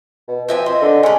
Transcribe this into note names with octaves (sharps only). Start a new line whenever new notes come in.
B2
F3 C4 E5 G#5
C5 D#5
D3
G#3 A3 C#4